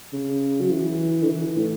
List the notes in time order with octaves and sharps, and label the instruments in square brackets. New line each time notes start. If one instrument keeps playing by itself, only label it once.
[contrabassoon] C#3
F#3
E3
D3
E3
A2